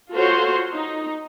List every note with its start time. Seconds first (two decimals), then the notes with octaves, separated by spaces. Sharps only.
0.14 F4 F#4 A4 C5 C#5 C6
0.72 D#4